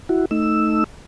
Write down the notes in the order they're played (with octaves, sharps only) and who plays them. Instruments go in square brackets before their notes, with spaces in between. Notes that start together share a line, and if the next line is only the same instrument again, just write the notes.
[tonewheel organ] E4 F#4
A3 D#4 E6